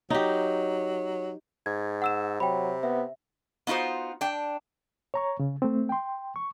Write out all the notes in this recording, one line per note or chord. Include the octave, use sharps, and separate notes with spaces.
F#3 D#4 G4
G#2 G#6
F#5 E6 E7
C3 F#3 G5 B5
B3 E5
B3 D#4 F4 F#4 C5
D4 G5
C#5 A#5 C#6
C#3
A3 C4
G5 C6
C#6